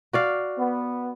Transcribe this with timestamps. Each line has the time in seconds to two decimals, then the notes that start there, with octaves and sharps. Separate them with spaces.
0.13 F#4 D5 F5
0.58 B3